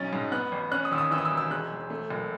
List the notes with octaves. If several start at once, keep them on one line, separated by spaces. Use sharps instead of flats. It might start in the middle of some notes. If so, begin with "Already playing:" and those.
Already playing: B1 C#4 A6
G#2
B3 F#6
A1
C#4 F#6
D#6
D#2 E6
D#6
E3 E6
D#6
E6
E1
E6
G#3 F#6
E1
A3
F#1